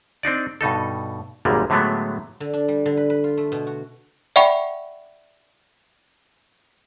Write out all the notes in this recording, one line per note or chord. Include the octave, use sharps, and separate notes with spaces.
C4 D4 D#4 D5
G2 B2 D#4 A4
G#1 F#2 A#2 G3 G#3
A2 D3 F#3 G#3 A3 B3
D3
D4
G3
D3
B4
B4
F4
A3
B2
F#4
D5 E5 F#5 G5 B5 C#6